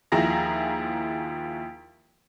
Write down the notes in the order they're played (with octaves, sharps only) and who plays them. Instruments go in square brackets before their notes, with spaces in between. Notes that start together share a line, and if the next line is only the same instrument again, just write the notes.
[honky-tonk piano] D#2 F3 E4 G#4 A#5 A#6